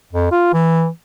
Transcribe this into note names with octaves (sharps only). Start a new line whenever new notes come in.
F2
F4
E3